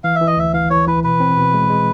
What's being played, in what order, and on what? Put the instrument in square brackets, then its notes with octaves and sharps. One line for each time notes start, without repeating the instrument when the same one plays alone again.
[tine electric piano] E3 [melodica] F5
[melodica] E5
[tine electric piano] E3
[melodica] D#5
[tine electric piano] D2 [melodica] E5
[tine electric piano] E3 [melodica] F5
[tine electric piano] E3 [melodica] C#5
[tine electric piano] E3 [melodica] B4
[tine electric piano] B2 [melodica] B4
[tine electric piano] C4
B2
G#3
G#3